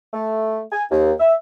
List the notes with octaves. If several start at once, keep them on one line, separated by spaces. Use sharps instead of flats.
A3
G#5
D#2
E5